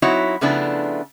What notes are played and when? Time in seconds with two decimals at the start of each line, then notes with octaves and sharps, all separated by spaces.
0.02 F#3 C4 D#4 E4 F#4 C#5
0.41 C#3 F3 A3 B3 D4 E4